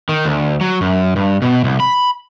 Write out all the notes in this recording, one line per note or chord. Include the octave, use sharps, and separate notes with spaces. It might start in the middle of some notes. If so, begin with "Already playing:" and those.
D#3
D2
F#3
F#2
G2
B2
C2
B5